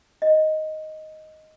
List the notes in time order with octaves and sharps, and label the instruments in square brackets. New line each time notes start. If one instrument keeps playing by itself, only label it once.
[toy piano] D#5